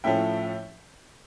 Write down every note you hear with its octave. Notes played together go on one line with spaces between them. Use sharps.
A2 F3 A3 C#4 E5 G5